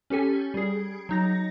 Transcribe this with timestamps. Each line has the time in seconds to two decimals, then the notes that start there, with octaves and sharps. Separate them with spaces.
0.10 C#4 G4 A4 G#5
0.54 G3 G#4
1.09 F#3 D#4 A#6